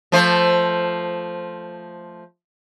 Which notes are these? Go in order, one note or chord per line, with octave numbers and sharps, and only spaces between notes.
F3 A3 C5